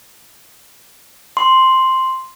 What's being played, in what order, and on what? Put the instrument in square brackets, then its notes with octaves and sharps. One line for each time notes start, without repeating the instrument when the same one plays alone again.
[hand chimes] C6